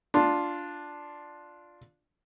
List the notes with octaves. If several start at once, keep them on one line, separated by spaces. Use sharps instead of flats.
D4 F4